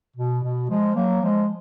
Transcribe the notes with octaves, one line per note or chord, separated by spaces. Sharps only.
B2
B2
F3 G#3
F#3 A#3
F3 G#3